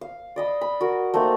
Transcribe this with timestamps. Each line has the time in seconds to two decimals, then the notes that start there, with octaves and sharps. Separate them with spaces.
0.01 F5
0.36 D5 D#5 B5
0.61 B5
0.81 F#4 A#4
1.14 A3 A#3 C4 D#4